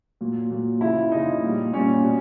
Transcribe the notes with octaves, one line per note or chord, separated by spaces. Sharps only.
A#2 F#3
A#2 F#3
C#3 F3 E4
C#3 F3 D#4
A#2 G3
A#2 G3 C#4
B2